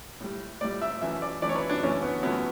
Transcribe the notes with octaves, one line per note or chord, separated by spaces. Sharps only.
A2 G3
A2 G3 D5
E5
F#2 E3 A3 E5
D5
F#2 E3 A3 D5
C#5
B4
D4
F#2 E3 A3 C#4
B3
F#2 E3 A3 B3